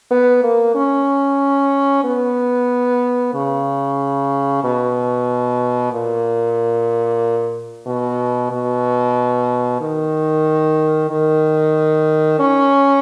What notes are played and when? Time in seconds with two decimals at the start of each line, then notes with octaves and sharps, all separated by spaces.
0.11 B3
0.43 A#3
0.75 C#4
2.05 B3
3.34 C#3
4.64 B2
5.93 A#2
7.87 B2
8.51 B2
9.81 D#3
11.10 D#3
12.40 C#4